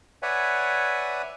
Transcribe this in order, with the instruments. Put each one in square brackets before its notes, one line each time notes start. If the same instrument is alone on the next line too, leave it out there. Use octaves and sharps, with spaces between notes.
[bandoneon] B4 C#5 D5 E5 F#5 G#5